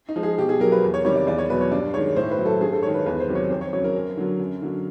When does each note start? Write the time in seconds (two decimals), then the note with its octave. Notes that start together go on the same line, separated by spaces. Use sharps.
0.09 D#4
0.16 F3 G#3
0.23 G#4
0.38 B2 G4
0.49 G#4
0.60 F#3 A#4
0.72 B4
0.83 E2
0.94 C#5
1.05 C3 D#3 G3 C#5
1.16 D5
1.27 E2 D5
1.38 C#5
1.50 B2 F#3 B4
1.61 C#5
1.71 G2 D5
1.94 D#3 G#3 C#5
2.16 A2 C5
2.31 B4
2.39 F#3
2.46 A4
2.61 G2 G#4
2.73 A4
2.83 D#3 G#3 C#5
2.94 B4
3.06 E2 B4
3.20 C5
3.28 C3 D#3 F#3
3.35 C#5
3.50 F2 C5
3.61 C#5
3.73 C#3 F#3 C#5
3.84 A#4
3.95 F#2
4.17 D3 F#3
4.40 F#2
4.62 D3 F#3